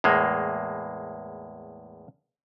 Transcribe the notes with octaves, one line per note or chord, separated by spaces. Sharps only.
E2 A2 G#3 A#3